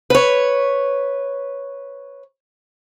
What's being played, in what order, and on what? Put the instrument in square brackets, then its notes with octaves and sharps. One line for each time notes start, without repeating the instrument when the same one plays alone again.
[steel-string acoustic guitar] B4 C#5